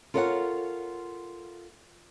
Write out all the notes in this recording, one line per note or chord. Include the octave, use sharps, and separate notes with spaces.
F4 A4 A#4 C#5 D5 F#5